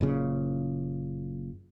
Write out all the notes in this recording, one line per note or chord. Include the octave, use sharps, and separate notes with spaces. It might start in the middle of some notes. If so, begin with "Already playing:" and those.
F#1 A#2 C#3